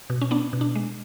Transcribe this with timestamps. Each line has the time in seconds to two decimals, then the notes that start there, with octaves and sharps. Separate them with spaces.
0.10 B2
0.21 C#4
0.31 B3 D4
0.53 B2
0.61 D4
0.75 G#3